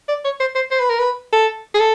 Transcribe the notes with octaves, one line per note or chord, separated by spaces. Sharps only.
D5
C#5
C5
C5
C5
B4
A#4
B4
A4
G#4
A4